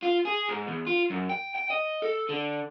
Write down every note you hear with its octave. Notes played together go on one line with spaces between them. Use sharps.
F4
G#4
G#2
E2
F4
F#2
G5
G5
D#5
A4
D3